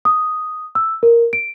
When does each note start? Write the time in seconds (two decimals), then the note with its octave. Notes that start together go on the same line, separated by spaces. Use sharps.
0.05 D#6
0.75 E6
1.03 A#4
1.33 D7